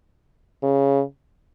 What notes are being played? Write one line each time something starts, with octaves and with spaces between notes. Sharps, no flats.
C#3